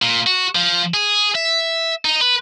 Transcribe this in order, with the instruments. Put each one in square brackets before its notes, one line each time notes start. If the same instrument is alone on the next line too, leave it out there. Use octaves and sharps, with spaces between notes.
[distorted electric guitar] A#2
F#4
F3
G#4
E5
D#4
B4